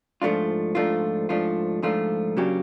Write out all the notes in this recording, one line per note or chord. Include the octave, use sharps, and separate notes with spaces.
G#2 F3 A3 D4 F4
G#2 F3 A3 D4 F4
G#2 F3 A3 D4 F4
G#2 F3 A3 D4 F4
C#3 F#3 A#3 D4 G4